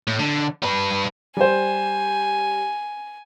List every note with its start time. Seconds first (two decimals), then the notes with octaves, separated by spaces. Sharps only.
0.07 A2
0.19 D3
0.63 G3 B4
1.37 G3 C5 G#5